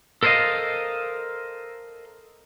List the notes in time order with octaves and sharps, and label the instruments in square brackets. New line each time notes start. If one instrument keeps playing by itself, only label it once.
[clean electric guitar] A4 A#4 C5 C#5 D#5 F5